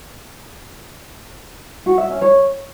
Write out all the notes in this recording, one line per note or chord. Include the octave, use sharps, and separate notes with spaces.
F#4
E5
C#4
C#5